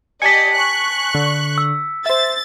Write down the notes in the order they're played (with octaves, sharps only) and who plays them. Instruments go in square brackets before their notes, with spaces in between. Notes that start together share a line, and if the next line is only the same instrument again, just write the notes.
[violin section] G4 D5 D#5 [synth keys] G#5 A5 [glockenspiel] B6 C#7
[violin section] C#6 F#6
[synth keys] D3
[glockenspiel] E6
[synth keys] C5 E5 [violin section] A6